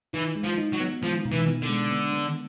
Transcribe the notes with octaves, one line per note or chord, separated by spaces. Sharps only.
E3 D#4
G#3
F3
D#4
F#3
B3
F3 G#3
B2
E3
B3
D3
G#3
B3
B3